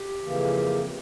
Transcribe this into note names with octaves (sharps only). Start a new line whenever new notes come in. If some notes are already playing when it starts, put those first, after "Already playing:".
Already playing: G4
F2 C#3 E3 A#3